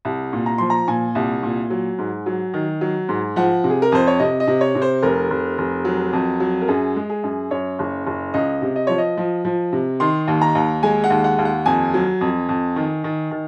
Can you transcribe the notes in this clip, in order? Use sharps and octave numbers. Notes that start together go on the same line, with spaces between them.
C2
A#2
A#5
F3 C6
A#5
A#2 G#5
C2
A#2
F#3
G#2
F#3
D#3
F#3
G#2
F3 F#5
C3
G#4
A#4
F2 C5
C#5
C3 D#5
D#5
C3
C#5
C3
C5
F1 A#4
F1
F1
F#3
F2
F#3
A#4
F#2 G#4
G#3
G#4
F#2
F#2 C#5
F#1
F#1
C#2 D#5
C3
D#5
F3 C#5
D#5
F3
F3
C3
D#3 C6
D#2
A#5
D#2
G#3 G#5
F#5
D#2
F#5
D#2
F#5
F2 G#5
F#3
F2
F2
D#3
D#3
D#3